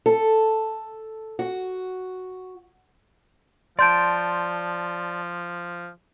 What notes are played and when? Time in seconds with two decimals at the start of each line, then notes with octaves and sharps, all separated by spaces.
0.06 A4
1.39 F#4
3.79 F3 D5 A5 C6 G6 D7